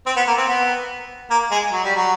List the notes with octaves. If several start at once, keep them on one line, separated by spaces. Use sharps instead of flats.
C4
B3
A#3
C4
B3
A#3
G#3
F#3
G3
F#3